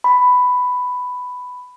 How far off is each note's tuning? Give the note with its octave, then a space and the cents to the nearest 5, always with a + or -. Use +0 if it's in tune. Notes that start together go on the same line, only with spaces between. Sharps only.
B5 +10